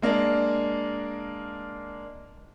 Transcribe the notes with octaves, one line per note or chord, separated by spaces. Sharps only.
G#3 A#3 D4